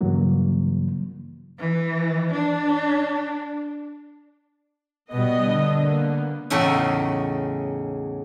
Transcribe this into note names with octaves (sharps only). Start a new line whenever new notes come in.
G2 C#3 E3 F#3 A#3
E3
D4
B2 G3 B3 D#5
D3
A#3 B3
E2 A2 C#3 C#4 D#4 E5